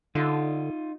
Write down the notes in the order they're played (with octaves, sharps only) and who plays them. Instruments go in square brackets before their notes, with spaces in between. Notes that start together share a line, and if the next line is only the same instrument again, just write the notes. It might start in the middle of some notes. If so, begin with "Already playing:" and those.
[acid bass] D3 [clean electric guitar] D#4 F4